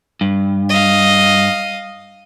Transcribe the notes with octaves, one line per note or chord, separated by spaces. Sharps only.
G2
D#5 F5